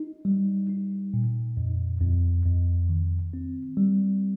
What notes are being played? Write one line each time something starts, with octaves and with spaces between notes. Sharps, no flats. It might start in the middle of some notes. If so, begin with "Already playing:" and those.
Already playing: D#4
G3
D#4
A#2
F2
F2
F2
D#3
C4
G3